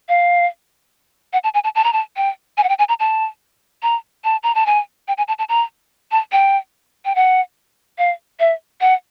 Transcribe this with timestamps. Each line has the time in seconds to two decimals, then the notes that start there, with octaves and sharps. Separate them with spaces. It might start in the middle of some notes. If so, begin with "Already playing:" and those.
0.09 F5
1.33 F#5
1.44 A5
1.54 G#5
1.64 A5
1.75 A5
1.84 A#5
1.93 A5
2.16 G5
2.57 G#5
2.64 F#5
2.69 G5
2.79 G#5
2.89 A#5
3.00 A5
3.83 A#5
4.24 A5
4.43 A#5
4.55 A5
4.66 G#5
5.08 G5
5.18 G#5
5.28 A5
5.39 A5
5.49 A#5
6.12 A5
6.32 G5
7.05 G5
7.16 F#5
7.98 F5
8.40 E5
8.81 F#5